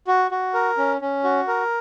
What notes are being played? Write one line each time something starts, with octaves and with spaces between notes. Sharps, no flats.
F#4
F#4
A#4
C#4
C#4
F#4
A#4